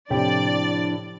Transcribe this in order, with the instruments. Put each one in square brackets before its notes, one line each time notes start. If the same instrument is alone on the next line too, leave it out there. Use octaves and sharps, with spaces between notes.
[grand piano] A2 C3 G4 [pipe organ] F3 D4 E4 [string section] D5